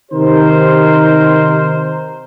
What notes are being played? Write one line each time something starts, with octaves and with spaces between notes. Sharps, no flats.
C3 D#3 D#4 G4 A#4 C5